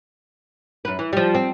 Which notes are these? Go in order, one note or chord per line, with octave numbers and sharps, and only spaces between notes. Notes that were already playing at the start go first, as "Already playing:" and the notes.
F#2 B4
E3
F3 G3
C4